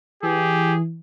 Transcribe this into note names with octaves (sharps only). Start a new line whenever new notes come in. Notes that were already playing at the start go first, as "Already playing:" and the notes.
E3 G4 G#4